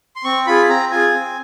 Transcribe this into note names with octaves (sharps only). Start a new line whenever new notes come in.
C6
C4 C#6
F4 G#4 B5
C4 A#5
F4 G#4 G#5
C4